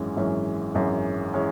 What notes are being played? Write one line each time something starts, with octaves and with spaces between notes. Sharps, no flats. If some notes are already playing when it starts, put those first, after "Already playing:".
Already playing: G#1 F#2 E3 G#3 C#4
G#1 F#2 E3 G#3 C#4
G#1 F#2 E3 G#3 C#4
E3 G#3 C#4